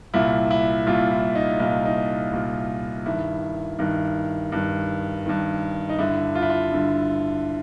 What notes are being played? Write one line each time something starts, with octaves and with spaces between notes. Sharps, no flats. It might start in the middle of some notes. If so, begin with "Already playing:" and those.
C2 A#2 E4
E4
C2 A#2 F4
E4
D#4
C2 A#2 D#4
D#4
C2 A#2
G2 D#3 E4
G2 D#3
G2 D#3
G2 D#3
D#4
G2 D3 E4
F4
E4
F4
G2 D3